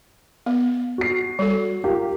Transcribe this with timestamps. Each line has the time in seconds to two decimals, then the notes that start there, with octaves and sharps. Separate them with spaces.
0.46 B3
0.98 F#4 C7
1.39 G3 A4
1.84 F4 G4 A#4